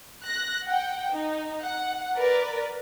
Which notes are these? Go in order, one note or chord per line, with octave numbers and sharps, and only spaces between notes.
F#6 A#6
F#5 G5
D#4
F#5
A#4 B4 D5